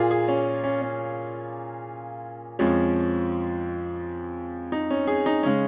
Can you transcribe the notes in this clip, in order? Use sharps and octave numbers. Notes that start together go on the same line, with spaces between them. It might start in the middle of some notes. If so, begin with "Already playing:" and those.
Already playing: A#2 A#3 F4 G#4
G#4
C#4
C#4
C#4
F2 F3 G#3 C#4
D#4
C#4
G#4
D#4
C#3 G#3 C#4